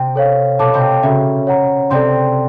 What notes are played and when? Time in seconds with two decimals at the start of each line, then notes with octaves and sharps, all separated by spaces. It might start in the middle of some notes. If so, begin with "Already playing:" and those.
Already playing: C3 C4
0.16 A4 C#5 F5
0.59 B2 B3 A4 C#5 F5 A5 D6
0.74 C3 C4
1.03 C#3 C#4 F#4 A4 C#5 E5
1.47 C#5 F#5 A#5
1.90 C3 C4 A4 D5 G5 C6